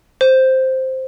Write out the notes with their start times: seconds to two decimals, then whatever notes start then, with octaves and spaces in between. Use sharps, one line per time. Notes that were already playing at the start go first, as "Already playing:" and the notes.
0.21 C5